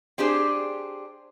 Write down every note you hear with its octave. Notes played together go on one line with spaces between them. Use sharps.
C4 D4 G4 G#4 C5